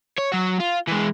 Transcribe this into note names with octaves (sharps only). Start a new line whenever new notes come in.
C#5
F#3 F#4
F4
E3 G#3